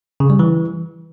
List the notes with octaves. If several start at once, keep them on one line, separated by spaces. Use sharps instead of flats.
C#3
G3
E3